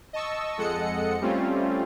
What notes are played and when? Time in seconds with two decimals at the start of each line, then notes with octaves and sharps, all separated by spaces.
0.13 D#5 A5 C#6 E6
0.58 F2 G#3 A4 D#5 F#5 C#7
1.21 G3 A3 C4 C#4 F4